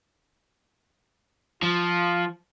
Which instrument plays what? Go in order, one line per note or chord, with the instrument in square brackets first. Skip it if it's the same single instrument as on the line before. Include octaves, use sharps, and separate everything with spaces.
[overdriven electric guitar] F3 [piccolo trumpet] F4